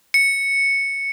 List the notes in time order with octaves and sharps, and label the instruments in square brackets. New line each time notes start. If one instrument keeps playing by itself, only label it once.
[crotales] C#7